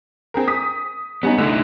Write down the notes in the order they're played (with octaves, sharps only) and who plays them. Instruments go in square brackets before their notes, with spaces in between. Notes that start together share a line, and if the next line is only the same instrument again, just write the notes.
[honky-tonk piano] C4 G#4 A#4
D#6 B6
[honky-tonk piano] G3 C#4 D#4 [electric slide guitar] B3
[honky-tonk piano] D3 [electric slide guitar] A3 D#4 E4